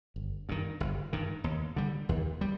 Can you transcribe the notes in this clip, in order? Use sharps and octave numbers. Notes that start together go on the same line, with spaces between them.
G1
G2 D#3
G1
G2 D#3
D#2
D3 G3
D#2
G3